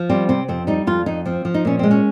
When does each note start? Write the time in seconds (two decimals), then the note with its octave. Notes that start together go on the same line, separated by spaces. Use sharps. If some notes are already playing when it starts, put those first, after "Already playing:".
Already playing: F3
0.10 G3 C4
0.29 C3 C4
0.48 F2 C4
0.67 G3 D#4
0.87 F2 F4
1.06 F2 D#4
1.26 F3 C4
1.45 F3
1.54 D#4
1.65 A#2 C#4
1.79 G#3 C4
1.91 C#4